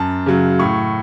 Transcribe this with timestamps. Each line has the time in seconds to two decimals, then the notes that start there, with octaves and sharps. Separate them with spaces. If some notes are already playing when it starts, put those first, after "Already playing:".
Already playing: F#2 A5
0.26 C#3 F#3
0.59 A2 C#6